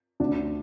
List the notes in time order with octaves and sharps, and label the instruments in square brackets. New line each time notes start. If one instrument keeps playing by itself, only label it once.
[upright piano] D2 D4